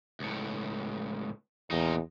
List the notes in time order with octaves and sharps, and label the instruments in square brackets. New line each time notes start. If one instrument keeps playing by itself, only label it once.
[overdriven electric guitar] C#2 A2
[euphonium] E2 [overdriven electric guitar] A#2 D#4